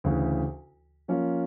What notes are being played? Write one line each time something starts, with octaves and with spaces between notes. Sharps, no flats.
D2 C#3 E3
F3 A#3 C#4 F4